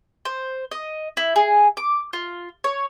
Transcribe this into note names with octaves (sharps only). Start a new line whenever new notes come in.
C5
D#5
E4
G#4
D6
F4
C#5